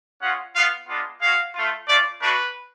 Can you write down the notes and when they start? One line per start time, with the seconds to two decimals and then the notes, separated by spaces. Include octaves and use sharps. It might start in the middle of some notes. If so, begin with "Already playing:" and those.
0.21 G#3 C#4 F4 F#5
0.55 B3 F4 F5
0.88 G#3 B3 D4 F4
1.21 G#3 C#4 F#4 F5
1.55 A3 F4
1.88 A3 C#4 F4 D5
2.21 A3 D4 F#4 B4